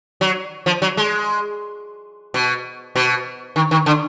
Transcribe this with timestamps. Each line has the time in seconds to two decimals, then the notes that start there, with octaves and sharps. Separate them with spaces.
0.21 F#3
0.66 F3
0.82 F#3
0.97 G#3
2.34 B2
2.95 B2
3.56 D#3
3.71 D#3
3.86 D3